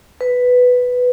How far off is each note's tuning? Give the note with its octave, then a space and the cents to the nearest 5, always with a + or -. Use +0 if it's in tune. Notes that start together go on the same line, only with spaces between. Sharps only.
B4 +5